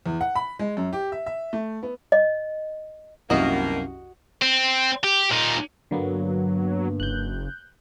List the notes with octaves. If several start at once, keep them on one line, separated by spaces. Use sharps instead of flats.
E2
F#5
B5
G#3
F#2
G4
E5
E5
A3
B3
D#5
C2 F#2 B2 D#3 A#3 F#4 D#5
C4
G4
A#2 D#4
G2 D3 F#3 A#3 B3
F#1 F#6 G6